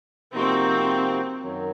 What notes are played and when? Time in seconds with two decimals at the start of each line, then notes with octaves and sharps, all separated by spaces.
0.33 C3 F3 A#3 C4 D#4 F#4
1.42 F#2 D#3 F#3